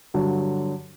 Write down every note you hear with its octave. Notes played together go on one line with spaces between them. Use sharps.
G2 D3 F#3